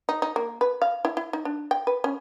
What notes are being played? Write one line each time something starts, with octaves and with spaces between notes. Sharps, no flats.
D#4
D#4
A#3
B4
F5
E4
E4
D#4
D4
G5
B4
C#4